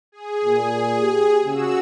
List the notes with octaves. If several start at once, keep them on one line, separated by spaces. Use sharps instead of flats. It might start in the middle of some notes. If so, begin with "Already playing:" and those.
G#4
A#2
G4
C#3 F#4 E6